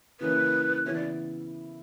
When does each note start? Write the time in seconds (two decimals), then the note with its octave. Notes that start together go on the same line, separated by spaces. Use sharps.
0.20 C#3 E3 A#3 C#4 E4 B4
0.86 C#3 E3 B3 E4 C#5
0.94 D5